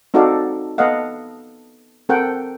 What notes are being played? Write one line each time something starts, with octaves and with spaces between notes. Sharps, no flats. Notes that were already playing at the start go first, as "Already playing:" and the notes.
C4 D#4 F#4 A4 D5 F5
B3 A4 B4 D#5 F5 F#5
C4 A4 A#4 F#5 G5